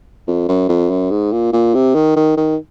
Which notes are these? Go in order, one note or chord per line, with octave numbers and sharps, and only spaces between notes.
F2
F#2
F2
F#2
G#2
A#2
A#2
C3
D#3
D#3
D#3